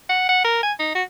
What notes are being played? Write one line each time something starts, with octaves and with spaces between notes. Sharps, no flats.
F#5
F#5
A#4
G#5
D#4
F#4